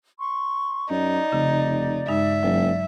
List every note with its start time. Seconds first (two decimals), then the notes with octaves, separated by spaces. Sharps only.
0.20 C6 C#6
0.90 F#2 D#4 D5
1.32 F1 C#3
2.08 G2 G#3 D#4 E5
2.43 F#1 F#3